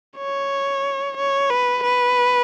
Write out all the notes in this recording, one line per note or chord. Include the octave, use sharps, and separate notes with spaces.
C#5
C#5
B4
B4